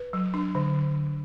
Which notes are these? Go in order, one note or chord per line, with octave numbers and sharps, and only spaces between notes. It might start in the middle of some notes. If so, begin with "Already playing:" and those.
Already playing: B4
F#3
D4
D3